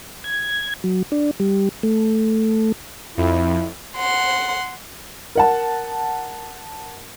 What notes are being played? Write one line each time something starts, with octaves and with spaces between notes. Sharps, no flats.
G#6
F#3
D4
G3
A3
F2 E4
F#5 C6
A#4 F#5 A5